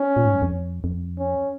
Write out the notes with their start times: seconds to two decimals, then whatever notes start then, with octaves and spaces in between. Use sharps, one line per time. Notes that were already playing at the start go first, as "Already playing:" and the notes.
Already playing: C#4
0.16 A#2
0.25 G#2
0.34 F#2
0.42 F2
0.84 F2
1.19 C#4